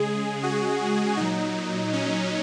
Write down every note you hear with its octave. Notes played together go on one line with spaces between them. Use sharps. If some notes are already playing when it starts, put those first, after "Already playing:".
Already playing: C#3 G#3 G#4
F#4
A#2 F#3 D#4
C#4